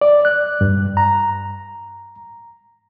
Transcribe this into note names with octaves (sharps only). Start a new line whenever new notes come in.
D5
F#6
G2
A#5